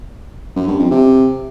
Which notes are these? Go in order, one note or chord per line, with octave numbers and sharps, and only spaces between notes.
F#2
G2
F2
C3